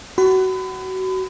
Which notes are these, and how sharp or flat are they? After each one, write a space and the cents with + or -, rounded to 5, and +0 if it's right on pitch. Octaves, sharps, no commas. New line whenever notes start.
F#4 +25 B5 +35